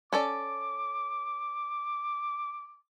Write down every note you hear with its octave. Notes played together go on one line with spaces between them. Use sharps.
C#4 A4 D5 D6